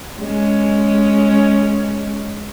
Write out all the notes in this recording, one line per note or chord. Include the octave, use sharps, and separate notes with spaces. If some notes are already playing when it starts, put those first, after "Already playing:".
G#3 C#4